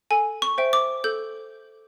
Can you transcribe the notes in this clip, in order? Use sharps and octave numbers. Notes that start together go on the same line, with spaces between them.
A4 G#5
C#6
C5 E5 G5
D6
A4 G6